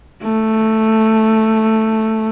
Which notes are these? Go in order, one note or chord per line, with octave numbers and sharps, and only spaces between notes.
A3